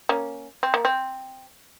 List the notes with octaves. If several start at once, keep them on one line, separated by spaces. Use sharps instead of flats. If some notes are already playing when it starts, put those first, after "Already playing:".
A#3 C#4
C4
A#3
C4